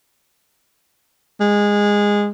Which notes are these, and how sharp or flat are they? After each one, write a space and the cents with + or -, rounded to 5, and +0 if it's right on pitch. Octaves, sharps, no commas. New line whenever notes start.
G#3 -15